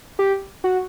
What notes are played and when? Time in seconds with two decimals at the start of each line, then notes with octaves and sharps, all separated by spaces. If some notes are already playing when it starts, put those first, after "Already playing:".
0.19 G4
0.64 F#4